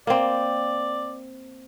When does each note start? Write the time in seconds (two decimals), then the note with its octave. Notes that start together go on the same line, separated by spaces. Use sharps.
0.07 A#3 C4 D5